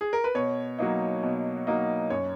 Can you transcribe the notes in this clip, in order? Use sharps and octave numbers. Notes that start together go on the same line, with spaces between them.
G#4
A#4
B4
B2 C#5
F#3 A#3 D#4
B2
F#3 A#3 D#4
F#2 C#5